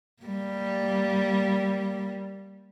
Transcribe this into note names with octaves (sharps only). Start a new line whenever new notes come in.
G3 A#3